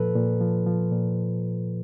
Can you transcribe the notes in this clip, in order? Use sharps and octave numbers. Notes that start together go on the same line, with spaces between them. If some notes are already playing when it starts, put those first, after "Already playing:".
Already playing: A#2 F3 A4 B4
A#2
F3
F3
A#2